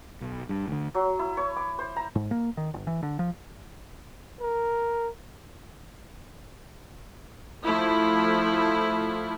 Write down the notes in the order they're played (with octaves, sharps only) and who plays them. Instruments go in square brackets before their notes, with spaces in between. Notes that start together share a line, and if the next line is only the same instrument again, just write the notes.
[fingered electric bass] B1
G2
D2 D3
[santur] F#3
E4
C#5
D6
C5
A#5
[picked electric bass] G#2
A#3
D#3
G1
E3
D3
F3
[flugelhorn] A#4
[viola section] F3 A3 E4